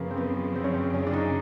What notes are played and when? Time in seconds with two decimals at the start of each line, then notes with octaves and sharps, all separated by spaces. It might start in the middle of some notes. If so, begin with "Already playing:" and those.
Already playing: F#2 C#3 F3 A#3 B3
0.11 C4
0.17 B3
0.56 C4
0.64 C#4
0.74 C4
0.94 C#4
1.07 D4
1.13 D#4